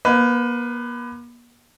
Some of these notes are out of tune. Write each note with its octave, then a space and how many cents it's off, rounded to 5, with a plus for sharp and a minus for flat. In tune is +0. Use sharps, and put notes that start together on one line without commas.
A#3 +45 B4 +25